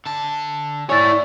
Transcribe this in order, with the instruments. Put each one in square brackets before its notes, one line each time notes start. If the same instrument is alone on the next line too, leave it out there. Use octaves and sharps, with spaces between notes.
[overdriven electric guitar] D3 A5
[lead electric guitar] E4 C#5 [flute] D5 [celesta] G#5 C#6 A6